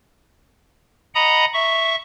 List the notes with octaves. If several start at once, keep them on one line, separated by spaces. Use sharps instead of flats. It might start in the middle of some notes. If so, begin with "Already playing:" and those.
D#5 F#5 A#5 B5 D#6
E5 C#6